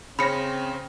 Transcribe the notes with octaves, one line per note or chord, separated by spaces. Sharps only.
C#3 C4 C#4 B5 A#6 C#7